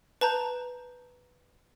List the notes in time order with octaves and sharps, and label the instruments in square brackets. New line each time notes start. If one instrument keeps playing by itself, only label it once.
[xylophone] B4 A5 A#5 G6